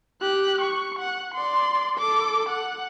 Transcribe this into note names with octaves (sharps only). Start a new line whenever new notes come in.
G4 F#6
C#6
F#5
D5 C6
A4 D6
F#5